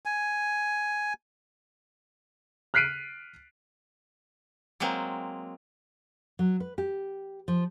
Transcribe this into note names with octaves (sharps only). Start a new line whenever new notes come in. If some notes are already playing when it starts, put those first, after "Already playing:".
G#5
F6 F#6 B6 C7 D7 D#7
F#3 G#3 A#3 C4
F#3
B4
G4
F3